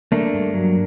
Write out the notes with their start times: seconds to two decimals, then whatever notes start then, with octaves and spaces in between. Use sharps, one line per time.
0.12 A3 A#3 D4
0.34 G2
0.54 F#3